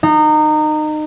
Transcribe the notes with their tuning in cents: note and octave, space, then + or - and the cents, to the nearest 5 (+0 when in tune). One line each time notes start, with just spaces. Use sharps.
D#4 -25